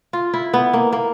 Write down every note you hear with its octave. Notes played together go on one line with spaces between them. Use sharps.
F4
E4
B3
A#3
A#3